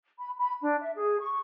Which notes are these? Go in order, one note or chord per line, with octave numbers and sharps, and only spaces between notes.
B5
B5
D4
E5
G#4
C#6